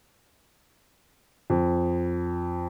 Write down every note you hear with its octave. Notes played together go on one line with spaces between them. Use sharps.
F2